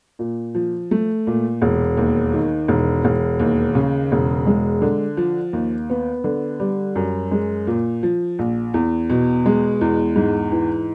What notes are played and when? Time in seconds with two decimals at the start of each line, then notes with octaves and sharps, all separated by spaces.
0.19 A#2
0.55 F3
0.91 A3
1.27 A#2
1.62 E1
1.97 D#2
2.34 D#3
2.68 E1
3.04 E1
3.39 D#2
3.75 C#3
4.12 E1
4.46 G#3
4.82 D3
5.17 F3
5.53 D#2
5.90 B3
6.24 D3
6.60 G3
6.96 F#2
7.31 G#3
7.67 A#2
8.03 F3
8.39 A#1
8.74 E2
9.10 B2
9.46 G#3
9.81 E2
10.16 G#2
10.52 E3